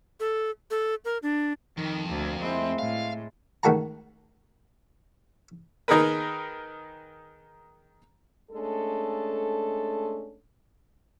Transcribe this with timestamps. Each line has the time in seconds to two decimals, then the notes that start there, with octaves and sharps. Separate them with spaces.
0.20 A4
0.71 A4
1.05 A#4
1.23 D4
1.77 F2 D#3
2.09 D2 A#3
2.42 G#3 A3 C4 E4
2.79 A2 F5
3.63 C#2 D#3 A3 F#4 A5 A#5
5.88 D#3 D#4 G#4 A#4 B4
8.52 G#3 A3 C#4 D4 A4